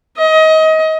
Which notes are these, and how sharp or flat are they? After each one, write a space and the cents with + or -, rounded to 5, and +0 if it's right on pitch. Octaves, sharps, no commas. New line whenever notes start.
D#5 +25